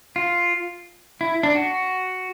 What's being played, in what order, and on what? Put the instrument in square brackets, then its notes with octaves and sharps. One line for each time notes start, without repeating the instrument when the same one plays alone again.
[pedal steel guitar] F4
E4
D4
F#4